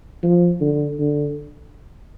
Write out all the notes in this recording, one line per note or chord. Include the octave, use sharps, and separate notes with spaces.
F3
D3
D3